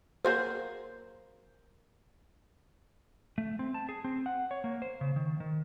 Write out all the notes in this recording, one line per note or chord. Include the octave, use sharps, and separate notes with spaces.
F#3 A#3 G#4 C5
A3
C4
A5
G#4
C4
F#5
C#5
A#3
C5
C#3
D#3
D#3